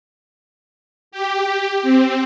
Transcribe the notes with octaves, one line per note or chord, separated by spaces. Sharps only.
G4
C4